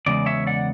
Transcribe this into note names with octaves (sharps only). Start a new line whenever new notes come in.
E2 C#3 G#3 D5
C#5 E5
D5 F#5